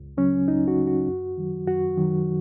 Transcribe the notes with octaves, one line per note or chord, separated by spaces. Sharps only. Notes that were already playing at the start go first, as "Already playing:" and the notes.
Already playing: C#2
C#3 F#3 C#4
C#2 D#4
F#4
C#3 F#3
F#4
F#2
D#3 F#3
F#2 F#4
D#3 F#3